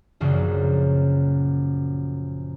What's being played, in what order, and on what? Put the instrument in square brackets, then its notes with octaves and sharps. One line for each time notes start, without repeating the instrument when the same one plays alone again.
[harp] A#1 F#2 C#3 F3